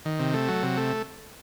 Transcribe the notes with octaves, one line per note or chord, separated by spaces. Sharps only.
D#3
C3
A3
F#3
C3
A3